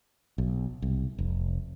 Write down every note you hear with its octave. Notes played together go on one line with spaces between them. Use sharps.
B1
C2
F1